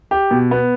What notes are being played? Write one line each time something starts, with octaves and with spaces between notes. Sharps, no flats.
G4
B2
B3